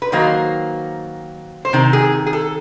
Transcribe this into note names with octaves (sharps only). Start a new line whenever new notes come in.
B4
D#3 F#3 A#3 C5
C5
C3 D#3
G#4
G#4
A4